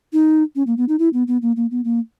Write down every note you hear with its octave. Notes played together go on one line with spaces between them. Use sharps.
D#4
C#4
A#3
B3
D#4
E4
B3
B3
A#3
A#3
B3
A#3